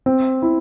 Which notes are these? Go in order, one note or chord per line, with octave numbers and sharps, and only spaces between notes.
C4
E4